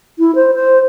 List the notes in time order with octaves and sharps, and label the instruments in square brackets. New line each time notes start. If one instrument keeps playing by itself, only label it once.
[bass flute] E4
C5
C5